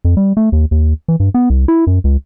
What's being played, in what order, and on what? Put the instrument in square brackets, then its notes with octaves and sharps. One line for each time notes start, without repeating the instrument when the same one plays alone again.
[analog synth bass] F2
G3
A3
D#2
D#2
E3
G2
B3
C2
E4
F#2
C#2